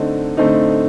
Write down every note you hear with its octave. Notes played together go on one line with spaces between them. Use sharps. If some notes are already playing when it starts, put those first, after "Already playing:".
Already playing: D3 A3 C4 D#4
D3 A3 C4 D#4